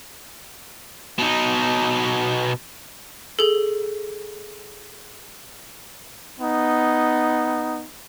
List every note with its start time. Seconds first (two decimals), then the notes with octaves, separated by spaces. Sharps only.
1.19 B2 D#4
3.39 G#4 A4
6.40 B3 D#4